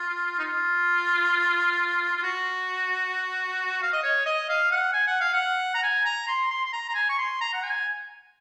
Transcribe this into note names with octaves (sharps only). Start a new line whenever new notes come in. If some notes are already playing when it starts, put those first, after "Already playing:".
Already playing: F4
D#4
F4
F4
F#4
F5
D#5
C#5
D#5
F5
F#5
G#5
F#5
F5
F#5
A#5
G#5
A#5
C6
C6
C6
A#5
A#5
G#5
C#6
C6
A#5
F#5
G#5